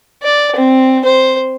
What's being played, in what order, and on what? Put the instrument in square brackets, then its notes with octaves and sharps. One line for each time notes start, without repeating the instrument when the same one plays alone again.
[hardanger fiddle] D5
C4
C5